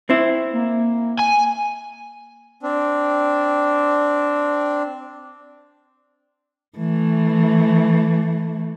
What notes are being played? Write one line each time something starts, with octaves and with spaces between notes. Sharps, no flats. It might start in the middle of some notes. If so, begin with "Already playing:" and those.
C4 E4
A#3
G#5
C4 D4
E3 A3